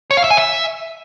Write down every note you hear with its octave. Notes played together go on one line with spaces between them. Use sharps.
C#5
F5
E5
G#5
E5